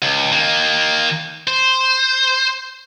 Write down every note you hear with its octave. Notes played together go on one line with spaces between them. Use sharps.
C#2
D#3 A#3
C5